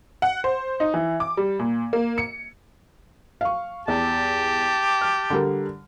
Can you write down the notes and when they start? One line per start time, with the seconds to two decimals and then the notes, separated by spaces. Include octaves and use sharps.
0.22 F#5
0.44 C5
0.80 D#4
0.94 E3
1.20 D6
1.37 G3
1.59 A#2
1.93 A#3
2.18 C#7
3.41 F5 C#6
3.88 E2 G4 A5
5.01 F6
5.30 D3 G3 A#4